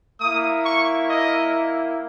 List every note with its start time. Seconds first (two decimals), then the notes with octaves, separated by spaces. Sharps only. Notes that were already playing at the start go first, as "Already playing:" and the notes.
0.20 A#3 E4 D#6
0.65 C#6
1.09 D#5